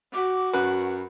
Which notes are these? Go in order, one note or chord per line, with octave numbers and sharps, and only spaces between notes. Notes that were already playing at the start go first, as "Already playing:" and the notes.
F#4 D6
F#2 B4 F#5